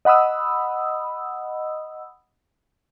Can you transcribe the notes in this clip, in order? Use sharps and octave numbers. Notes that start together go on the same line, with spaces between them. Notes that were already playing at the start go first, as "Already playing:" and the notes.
D#5 F#5 B5 D#6 E6